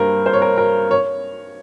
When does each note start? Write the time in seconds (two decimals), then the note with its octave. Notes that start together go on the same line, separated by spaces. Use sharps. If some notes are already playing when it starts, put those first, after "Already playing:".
Already playing: G2 G3 A#3 A#4 C5
0.26 C5
0.33 C#5
0.42 A#4
0.58 A#4
0.91 C#5